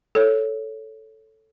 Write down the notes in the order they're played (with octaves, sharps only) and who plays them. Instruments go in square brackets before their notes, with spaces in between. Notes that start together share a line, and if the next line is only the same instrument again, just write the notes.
[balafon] A4 C#5